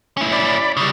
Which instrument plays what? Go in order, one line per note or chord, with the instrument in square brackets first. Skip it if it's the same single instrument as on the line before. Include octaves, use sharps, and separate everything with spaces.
[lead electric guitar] C#4 E4
[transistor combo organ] D5 B5
[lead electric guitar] C#3 G3